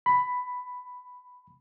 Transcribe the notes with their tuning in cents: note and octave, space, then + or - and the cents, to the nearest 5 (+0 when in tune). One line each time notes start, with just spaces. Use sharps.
B5 +10